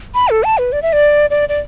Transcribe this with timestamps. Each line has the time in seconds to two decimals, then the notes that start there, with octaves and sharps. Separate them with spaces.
0.14 B5
0.29 A4
0.44 A5
0.58 B4
0.72 D5
0.82 E5
0.93 D5
1.30 D5
1.49 D5